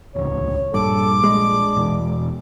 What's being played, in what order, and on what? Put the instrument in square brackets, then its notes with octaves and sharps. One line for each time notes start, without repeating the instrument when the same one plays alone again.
[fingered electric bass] D#1 C#2 [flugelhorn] C#5
[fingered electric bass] A#1 [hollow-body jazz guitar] G2 [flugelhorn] A4 [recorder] D6
[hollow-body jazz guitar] G#3 [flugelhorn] D4
[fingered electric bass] E1 E2 B2